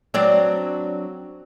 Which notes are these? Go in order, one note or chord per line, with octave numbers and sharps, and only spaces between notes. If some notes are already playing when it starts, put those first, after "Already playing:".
F#3 C4 D4